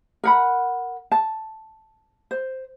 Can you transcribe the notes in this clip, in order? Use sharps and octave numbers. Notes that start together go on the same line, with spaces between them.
A#4 F#5 B5
A5
C5